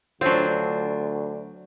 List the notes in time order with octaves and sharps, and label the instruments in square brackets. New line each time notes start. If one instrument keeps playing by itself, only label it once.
[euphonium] D2 [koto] F#3 C4 [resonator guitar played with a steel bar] D4 F4 [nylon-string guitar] C5 C#5